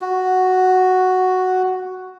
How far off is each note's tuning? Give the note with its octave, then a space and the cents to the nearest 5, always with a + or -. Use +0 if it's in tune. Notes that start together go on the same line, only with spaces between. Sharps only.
F#4 +0